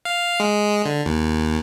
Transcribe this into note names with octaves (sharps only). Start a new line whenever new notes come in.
F5
G#3
D3
D#2